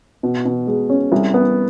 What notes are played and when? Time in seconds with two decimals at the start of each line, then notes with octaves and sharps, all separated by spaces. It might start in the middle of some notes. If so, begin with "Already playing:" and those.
0.23 B2
0.45 B2
0.67 G#3
0.90 C#4
1.12 C2
1.34 B3